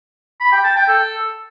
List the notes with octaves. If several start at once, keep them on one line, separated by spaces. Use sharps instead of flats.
B5
G5
A5
G5
A4